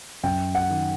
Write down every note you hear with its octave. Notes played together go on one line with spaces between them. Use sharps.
F#2 G5
F#5
D#3